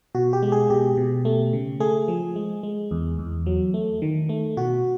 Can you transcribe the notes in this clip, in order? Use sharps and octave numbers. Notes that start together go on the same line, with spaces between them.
B2 F#4
G4
G#3
G#4
B2 G4
B2
A3
C#3
A3 G#4
F3
G#3
G#3
E2
E2
F#3
A3
D#3
A3
B2 F#4